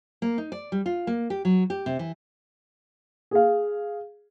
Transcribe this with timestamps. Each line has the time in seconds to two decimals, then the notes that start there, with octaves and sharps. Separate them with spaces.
0.22 A#3
0.38 D#4
0.52 D5
0.72 G3
0.86 F4
1.07 A#3
1.30 G4
1.45 F#3
1.70 G4
1.86 C3
1.99 E3
3.31 G#4 F5